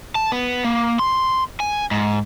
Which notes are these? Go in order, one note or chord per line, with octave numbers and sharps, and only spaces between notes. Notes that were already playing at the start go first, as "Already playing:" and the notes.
A5
B3
A#3
C6
G#5
G#2